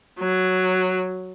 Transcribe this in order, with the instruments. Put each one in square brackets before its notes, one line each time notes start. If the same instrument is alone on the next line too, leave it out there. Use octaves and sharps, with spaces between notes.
[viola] F#3